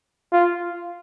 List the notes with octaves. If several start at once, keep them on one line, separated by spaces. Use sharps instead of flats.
F4